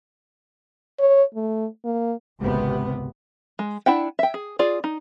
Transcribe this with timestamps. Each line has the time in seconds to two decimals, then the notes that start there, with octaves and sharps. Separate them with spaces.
0.99 C#5
1.35 A3
1.85 A#3
2.38 G#1 C#2 C3 B3
3.59 G#3
3.86 D4 E4 F#5 G5
4.19 E5 G5
4.34 G#4
4.59 F4 G#4 D5
4.84 D#4